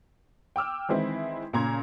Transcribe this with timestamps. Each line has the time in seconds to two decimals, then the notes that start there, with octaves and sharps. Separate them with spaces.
0.56 G5 D6 E6 F6
0.89 D#3 E3 G#3 C4 E4
1.53 A#2 C#3 A#5 C6 G#6